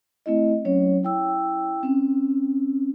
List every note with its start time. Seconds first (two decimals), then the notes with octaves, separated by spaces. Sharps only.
0.26 A3 C4 E4 D#5
0.65 F#3 C#4 C#5
1.03 E4 G5 E6
1.83 C4 C#4